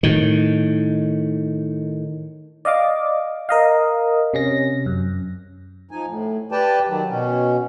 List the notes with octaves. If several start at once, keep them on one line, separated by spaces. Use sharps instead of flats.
A2 D#3
D5 D#5 F5 D6
A#4 D#5 F5
C3 C#4 A#6
F#2
F3 D#4 G#5
A2
G4 B4 D5 G5 A5
D#3 F#3
B2 C#4